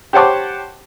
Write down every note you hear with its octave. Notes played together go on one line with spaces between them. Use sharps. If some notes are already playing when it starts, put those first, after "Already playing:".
G4 C5 C#5 F#5 A5 D6